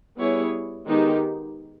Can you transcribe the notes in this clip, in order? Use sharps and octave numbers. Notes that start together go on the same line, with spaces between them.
G3 B3 E4 G#4 C#5
D#3 G#3 B3 D#4 G4